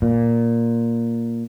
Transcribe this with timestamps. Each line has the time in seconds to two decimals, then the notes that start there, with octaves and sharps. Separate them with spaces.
0.02 A#2